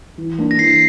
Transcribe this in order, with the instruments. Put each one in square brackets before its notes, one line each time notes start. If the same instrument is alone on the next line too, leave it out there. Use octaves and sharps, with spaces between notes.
[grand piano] E3
A#3 D4
[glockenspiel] A#6
[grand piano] E3 [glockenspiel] C7